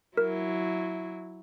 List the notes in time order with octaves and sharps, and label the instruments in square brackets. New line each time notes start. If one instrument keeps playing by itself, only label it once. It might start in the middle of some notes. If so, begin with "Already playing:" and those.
[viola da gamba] F#3 E4 [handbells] A#4